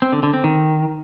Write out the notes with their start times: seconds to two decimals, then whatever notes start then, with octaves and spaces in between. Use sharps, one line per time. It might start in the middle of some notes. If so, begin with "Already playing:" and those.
0.02 C4
0.13 D3
0.23 D3
0.33 C4
0.44 D#3